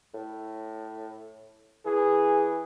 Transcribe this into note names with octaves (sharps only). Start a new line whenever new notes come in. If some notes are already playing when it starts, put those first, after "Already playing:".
A2
E3 G#4